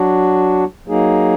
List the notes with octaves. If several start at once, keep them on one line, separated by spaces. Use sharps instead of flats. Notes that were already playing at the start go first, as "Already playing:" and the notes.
Already playing: F#3 D4 F#4
F#3 A#3 D#4 G#4